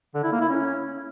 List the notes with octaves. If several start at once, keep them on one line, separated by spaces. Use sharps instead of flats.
D3
E4
A#3
E4
C#4